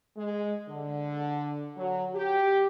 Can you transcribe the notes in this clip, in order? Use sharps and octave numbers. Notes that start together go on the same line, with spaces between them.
G#3
D3
F#3
G4